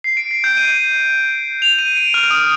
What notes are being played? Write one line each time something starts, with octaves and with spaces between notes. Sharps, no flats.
C7
D7
C7
G6
D#7
F7
D#7
D7
F6
D#6